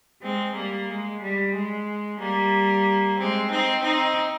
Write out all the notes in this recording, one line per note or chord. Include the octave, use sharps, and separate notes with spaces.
G#3 C4
G3 A#3
G#3
G3
G#3
G3 A#3
G#3 C4
C4 D#4
C4 D#4